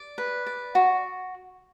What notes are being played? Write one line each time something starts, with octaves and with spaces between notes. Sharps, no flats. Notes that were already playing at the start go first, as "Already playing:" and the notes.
Already playing: D5
B4
D5
F#4